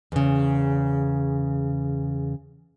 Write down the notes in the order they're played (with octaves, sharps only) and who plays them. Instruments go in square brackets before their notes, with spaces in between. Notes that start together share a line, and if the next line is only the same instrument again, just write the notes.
[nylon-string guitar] E2 C#3